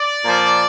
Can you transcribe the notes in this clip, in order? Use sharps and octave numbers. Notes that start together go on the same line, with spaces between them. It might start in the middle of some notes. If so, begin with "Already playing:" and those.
Already playing: D5
A#2 F3